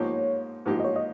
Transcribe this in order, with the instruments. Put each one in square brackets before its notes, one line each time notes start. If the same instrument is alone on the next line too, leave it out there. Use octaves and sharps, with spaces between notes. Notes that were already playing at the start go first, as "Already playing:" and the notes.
Already playing: [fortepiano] G#2 F3 A#3 D#4 G4 [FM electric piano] C#5
[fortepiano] G#2 F3 A#3 D#4 G4
[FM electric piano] D#5
C#5
D#5